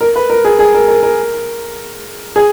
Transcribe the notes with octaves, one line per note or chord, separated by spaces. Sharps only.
A#4
B4
A#4
G#4
G#4
A#4
A#4
A#4
G#4